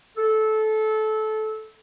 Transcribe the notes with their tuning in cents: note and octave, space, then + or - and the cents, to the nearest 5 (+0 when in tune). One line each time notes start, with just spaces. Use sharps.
A4 -20